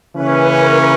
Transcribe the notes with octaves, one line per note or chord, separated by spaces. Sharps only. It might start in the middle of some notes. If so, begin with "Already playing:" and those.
C#3 E3 A#3 C#4 B4
A#4